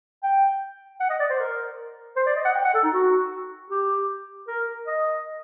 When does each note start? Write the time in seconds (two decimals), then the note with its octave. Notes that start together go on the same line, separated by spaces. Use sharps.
0.23 G5
1.00 F#5
1.10 D#5
1.20 D5
1.30 C5
1.40 A#4
2.16 C5
2.27 D5
2.36 D#5
2.45 F#5
2.55 G5
2.65 F#5
2.74 A4
2.83 D#4
2.93 F#4
3.71 G4
4.48 A#4
4.87 D#5